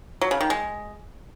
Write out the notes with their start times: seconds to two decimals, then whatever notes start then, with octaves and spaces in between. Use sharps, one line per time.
0.21 F#3
0.31 C#3
0.41 D#3
0.50 G#3